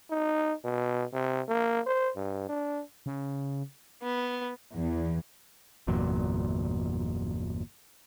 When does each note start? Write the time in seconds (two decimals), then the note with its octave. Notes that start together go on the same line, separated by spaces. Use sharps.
0.10 D#4
0.64 B2
1.13 C3
1.48 A#3
1.86 C5
2.16 G2
2.49 D4
3.06 C#3
4.02 B3
4.73 E2
5.87 G1 E2 A#2 F#3